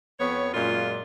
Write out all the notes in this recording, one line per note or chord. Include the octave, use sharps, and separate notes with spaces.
F2 B3 C#5
F#2 A#2 G#3 F4